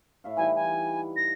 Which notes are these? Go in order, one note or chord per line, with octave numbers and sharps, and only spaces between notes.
A2 E5 F5
E3 G3 D#4 G#5
G#5
A#6